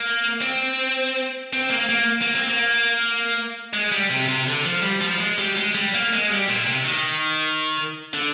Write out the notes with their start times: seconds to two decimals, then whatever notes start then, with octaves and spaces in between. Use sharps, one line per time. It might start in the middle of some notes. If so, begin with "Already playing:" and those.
Already playing: A#3
0.42 C4
1.53 C4
1.70 A#3
1.89 A#3
2.22 A#3
2.35 C4
2.49 A#3
3.73 G#3
3.91 G3
4.10 C3
4.28 C3
4.47 D3
4.65 F3
4.83 G3
5.02 F3
5.20 G#3
5.39 G3
5.57 G#3
5.75 G3
5.94 A#3
6.13 G#3
6.31 G3
6.48 A#2
6.67 C3
6.86 D#3
8.14 D3